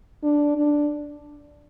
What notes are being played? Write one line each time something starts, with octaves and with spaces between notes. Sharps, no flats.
D4
D4